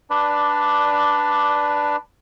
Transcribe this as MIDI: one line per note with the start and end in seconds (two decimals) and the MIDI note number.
0.10 1.96 62
0.10 1.96 71
0.10 1.96 74